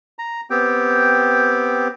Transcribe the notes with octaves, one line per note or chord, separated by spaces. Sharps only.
A#5
B3 C4 G4 G5